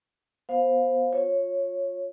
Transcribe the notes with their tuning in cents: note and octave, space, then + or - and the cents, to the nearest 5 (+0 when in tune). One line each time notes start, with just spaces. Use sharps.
B3 +0 C5 +0 F5 +15
F4 +20 C#5 -10